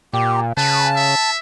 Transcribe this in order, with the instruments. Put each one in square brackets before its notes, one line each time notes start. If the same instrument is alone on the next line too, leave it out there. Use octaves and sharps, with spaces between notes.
[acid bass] A#2 [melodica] G4
[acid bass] C#3 [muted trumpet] B4 [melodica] A5
[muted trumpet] E5